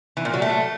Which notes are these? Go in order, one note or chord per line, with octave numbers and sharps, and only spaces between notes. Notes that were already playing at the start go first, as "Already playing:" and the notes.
E3
A#2
F#3
A3